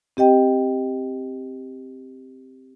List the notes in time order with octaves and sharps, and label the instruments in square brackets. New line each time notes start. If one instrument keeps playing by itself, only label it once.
[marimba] C4 G4 D#5 G5